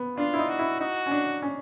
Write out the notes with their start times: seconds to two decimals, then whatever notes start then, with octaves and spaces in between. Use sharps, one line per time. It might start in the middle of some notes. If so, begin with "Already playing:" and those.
Already playing: B3
0.17 D4 F4
0.34 E4
0.39 D#4
0.49 F#4
0.59 E4
0.80 D#4 F#4
1.06 C#4
1.11 D4
1.42 C#4